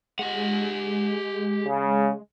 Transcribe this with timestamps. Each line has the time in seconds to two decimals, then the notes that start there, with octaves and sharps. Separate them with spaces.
0.19 G#3 G4 F#5
1.66 C#3